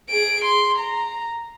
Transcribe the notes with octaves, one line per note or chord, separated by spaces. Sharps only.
G#4 D7
C6
A#5